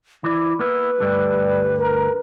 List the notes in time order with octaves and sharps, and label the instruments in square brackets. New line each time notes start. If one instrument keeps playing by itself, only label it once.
[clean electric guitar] E3 D5 [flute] E4
[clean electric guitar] A#3 B3 E4 [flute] B4
[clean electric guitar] D2 G2 D3 [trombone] G3
[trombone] A#4